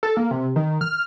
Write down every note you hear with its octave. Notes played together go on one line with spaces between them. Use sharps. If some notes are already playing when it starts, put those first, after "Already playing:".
A4
A#3
C3
D#3
F6